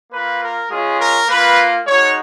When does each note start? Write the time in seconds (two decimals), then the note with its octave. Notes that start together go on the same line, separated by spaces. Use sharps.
0.12 A#3 F4 B4
0.41 A#4
0.70 G#3 C#4 F4 G#4
0.99 A#4
1.29 A#3 F4 B4
1.86 G#3 D#4 F#4 C#5